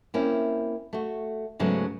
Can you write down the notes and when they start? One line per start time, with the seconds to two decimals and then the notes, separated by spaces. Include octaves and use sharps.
0.14 A#3 C4 C#4 E4
0.93 A3 F#4
1.59 G#2 C#3 F#3 G#3 A3 B3